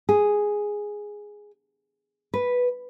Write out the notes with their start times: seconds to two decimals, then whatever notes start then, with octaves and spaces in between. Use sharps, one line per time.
0.09 G#4
2.34 B4